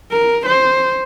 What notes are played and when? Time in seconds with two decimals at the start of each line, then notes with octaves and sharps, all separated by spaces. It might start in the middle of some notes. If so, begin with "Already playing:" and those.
0.11 A#4
0.46 C5